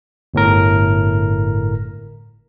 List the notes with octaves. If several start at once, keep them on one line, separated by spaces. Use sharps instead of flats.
G1 A2 A#4